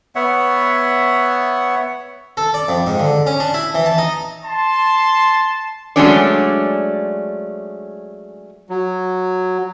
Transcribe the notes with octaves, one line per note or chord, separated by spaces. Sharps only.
B3 C#5 E5 F#5
A4
D5
F2
G#2
D3
C#4
D4
E4
E3
A5
D#4
A5 C6
F#3 G#3 A3 C#4 D4 D5
F#3